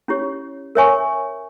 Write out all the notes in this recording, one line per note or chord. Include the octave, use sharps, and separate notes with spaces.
C#4 E4 G4 C#5
A#4 C#5 E5 G#5 C#6